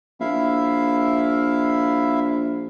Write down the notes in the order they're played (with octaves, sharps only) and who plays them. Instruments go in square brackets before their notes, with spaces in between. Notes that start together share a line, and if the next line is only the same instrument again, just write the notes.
[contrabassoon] A#1 [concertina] E4 E5 F5